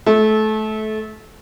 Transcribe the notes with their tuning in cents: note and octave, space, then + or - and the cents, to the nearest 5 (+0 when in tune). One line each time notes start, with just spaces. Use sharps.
A3 -25